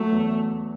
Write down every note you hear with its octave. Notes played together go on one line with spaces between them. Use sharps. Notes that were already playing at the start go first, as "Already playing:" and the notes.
Already playing: F#3 A3
E2